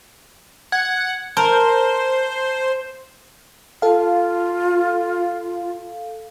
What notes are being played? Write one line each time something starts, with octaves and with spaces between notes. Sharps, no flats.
F#5 G#6
A#4 C5 A5
F4 A4 F5